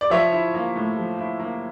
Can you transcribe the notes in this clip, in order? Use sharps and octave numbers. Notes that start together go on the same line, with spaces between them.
D5
F3 C#5 E5
E4
A#3
A2
F3
E4
A#3